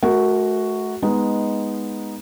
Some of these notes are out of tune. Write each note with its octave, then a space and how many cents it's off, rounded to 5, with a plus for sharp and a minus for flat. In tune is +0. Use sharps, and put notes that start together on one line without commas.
A3 -35 F#4 +0 A#4 +0
G#3 +0 B3 +0 D#4 +5